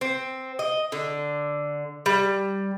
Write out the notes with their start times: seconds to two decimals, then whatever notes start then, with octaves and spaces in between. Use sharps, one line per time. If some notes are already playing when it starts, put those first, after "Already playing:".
0.01 C4
0.59 D#5
0.92 D3
2.06 G3